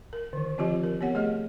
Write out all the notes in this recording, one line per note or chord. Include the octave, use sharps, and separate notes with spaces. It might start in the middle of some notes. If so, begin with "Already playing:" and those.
A#4
D3 D#3
F3 C4 F4 G4 D#5
A#4
B3 G4 C#5 F#5
A3 G#4 D#5